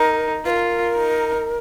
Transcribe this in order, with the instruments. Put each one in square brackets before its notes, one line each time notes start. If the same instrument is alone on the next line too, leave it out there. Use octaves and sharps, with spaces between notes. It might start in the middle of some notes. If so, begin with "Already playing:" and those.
Already playing: [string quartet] D#4 [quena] A#4
[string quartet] F4 [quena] A#4 B4
[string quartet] D#4